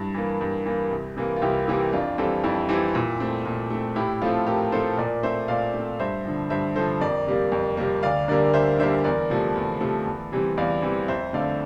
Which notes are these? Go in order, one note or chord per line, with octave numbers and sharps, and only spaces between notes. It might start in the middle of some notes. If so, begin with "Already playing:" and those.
Already playing: G2 E4
E3 A#3
G2
E3 A#3
C2
C3 E3 A#3
F4
C2 E4 G4
C3 E3 A#3 E4 G4
F2 D4 F4
E3 G3 C4 F4 A4
F2 E4
E3 G3 C4 E4 G4
A#2
A3 C4
A#2
A3 C4
A2 E4 G4
F3 A3 C4 F4 A4
A2 G4 A#4
F3 A3 C4 A4 C5
A#2 A#4 D5
A3 C4 C5 E5
A#2 D5 F5
A3
C4
G2 C5 E5
D3 F3
G2 C5 E5
D3 F3 A4 C5
F2 A#4 D5
C3 G3 A#3
F2
C3 G3 A#3
D2 D5 F5
D3 G3 A#3 A#4 D5
D2 C5 E5
D3 G3 A#3 C5 E5
E2 A#4 D5
C3 F3 A3
E2
C3 F3 A3
E2
C3 E3 G3 C4
E2 D5 F5
C3 E3 G3 C4
F2 C5 E5
D3 A3 C4 D5 F5